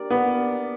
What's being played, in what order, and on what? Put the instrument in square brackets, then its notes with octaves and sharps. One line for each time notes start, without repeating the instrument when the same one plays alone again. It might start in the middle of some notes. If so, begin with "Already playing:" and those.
Already playing: [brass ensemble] A#3 D4 G4 A#4 D5
[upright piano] B3